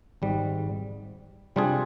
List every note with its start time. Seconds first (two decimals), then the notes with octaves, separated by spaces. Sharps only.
0.22 G#1 G#2 G3
1.56 C3 G3 D4 F4 G#4